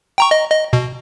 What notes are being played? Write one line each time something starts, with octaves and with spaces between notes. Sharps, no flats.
G5 A#5 C#6
D#5
D#5
B2